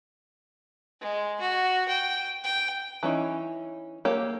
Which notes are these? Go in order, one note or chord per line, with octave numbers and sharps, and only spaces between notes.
G#3
F#4
G5
G5
E3 C#4 D#4
A#3 G4 A4 C#5